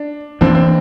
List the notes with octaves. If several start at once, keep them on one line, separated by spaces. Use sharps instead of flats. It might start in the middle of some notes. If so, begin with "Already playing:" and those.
Already playing: D4
E3 A#3 C4 D4
C4